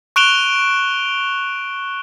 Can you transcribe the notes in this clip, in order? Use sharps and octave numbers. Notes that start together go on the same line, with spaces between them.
C#6 F#6 D7 E7 F7 G7